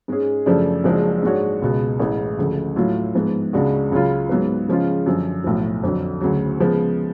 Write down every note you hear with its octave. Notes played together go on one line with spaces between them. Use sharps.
G#2 G#3 C#4 G#4
F#2 C#3 F3 A3 D4
F#1 F#2 F3 G#3 D4
G#2 G#3 D4 F#4 C#5
C#2 B2 G#3
A1 A2 G#3
D2 C#3 F3 A3
A2 F#3 A3 F4
G#2 F3 B3
C#2 C#3 G#3 D4 F#4
C#2 C#3 F#3 C#4 F4
G#2 F#3 B3
C#3 F3 G#3 C#4 F4
F#2 D3 F3
B1 A2 F3
F2 D3 F#3
D2 C#3 F#3
C#3 F3 G#3 B3